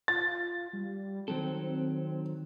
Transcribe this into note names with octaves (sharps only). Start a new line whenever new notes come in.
F4 A6
G3
D#3 F#3 C4 A4